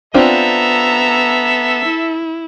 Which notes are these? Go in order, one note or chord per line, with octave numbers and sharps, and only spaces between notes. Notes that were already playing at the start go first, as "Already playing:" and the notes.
B3 C4 D4 F4 A4 E5 A#5
E4